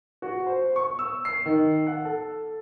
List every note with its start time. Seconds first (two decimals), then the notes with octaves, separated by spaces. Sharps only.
0.22 F#4
0.47 C5
0.76 C#6
0.99 E6
1.25 C7
1.46 D#3
1.87 F#5
2.05 A4